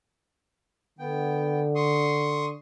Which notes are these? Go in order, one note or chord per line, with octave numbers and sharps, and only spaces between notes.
D3 B3 G5
C6 C#6 D#6